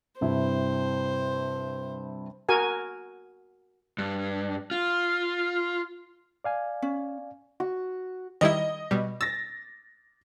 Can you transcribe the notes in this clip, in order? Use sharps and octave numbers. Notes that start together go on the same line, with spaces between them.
G2 C3 E4 C5
F#4 A#4 G#5
G2
F4
D5 F5 G#5
C#4
F#4
D#3 G3 E4 D#5
B2 G3
E6 A6 A#6